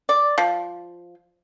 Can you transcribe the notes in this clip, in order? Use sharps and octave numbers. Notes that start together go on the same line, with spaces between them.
D5
F3